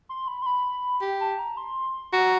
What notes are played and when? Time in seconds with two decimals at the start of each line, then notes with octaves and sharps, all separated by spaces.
0.09 C6
0.28 B5
0.42 C6
0.46 B5
1.02 G4
1.20 A5
1.39 A#5
1.57 C6
2.13 F#4 A#5